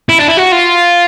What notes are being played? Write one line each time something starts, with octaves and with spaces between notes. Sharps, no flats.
E4
D4
E4
F#4
F4